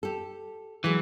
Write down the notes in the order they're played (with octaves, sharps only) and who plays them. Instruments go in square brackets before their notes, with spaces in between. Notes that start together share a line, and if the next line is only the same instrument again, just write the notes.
[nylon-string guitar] G4 A4
[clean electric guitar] E3 [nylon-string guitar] F#3 G#3